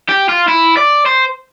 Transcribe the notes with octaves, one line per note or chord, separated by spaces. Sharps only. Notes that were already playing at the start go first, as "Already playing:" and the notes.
G4
F4
E4
D5
C5